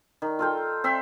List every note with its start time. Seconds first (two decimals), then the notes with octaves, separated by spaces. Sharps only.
0.22 D#3
0.39 F4 A4 G5
0.84 C4 E5 C6